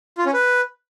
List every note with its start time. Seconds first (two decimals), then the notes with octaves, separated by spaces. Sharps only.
0.18 F4
0.26 C#4
0.34 B4